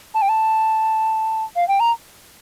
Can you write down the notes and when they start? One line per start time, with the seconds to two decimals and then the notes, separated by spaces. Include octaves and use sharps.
0.15 A5
0.22 G5
0.29 A5
1.56 F5
1.68 G5
1.80 A#5